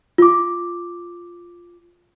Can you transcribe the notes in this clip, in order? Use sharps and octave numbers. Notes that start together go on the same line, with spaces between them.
F4 D6